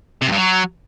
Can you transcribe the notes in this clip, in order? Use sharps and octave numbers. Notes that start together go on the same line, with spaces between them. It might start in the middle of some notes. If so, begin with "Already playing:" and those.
C3
F#2
G2
F#3